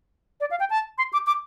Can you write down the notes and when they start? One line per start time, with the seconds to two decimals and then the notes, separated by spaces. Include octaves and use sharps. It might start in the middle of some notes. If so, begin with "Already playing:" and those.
0.40 D5
0.50 F5
0.60 G5
0.70 A5
0.98 C6
1.13 D6
1.27 D6